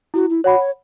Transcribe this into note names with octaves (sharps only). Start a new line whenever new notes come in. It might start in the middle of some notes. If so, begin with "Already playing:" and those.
E4 F#4
E4
F#4 C#5 F#5 B5
C#5